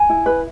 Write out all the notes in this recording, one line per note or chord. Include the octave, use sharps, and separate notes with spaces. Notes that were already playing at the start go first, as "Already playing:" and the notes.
Already playing: G#5
E4
B4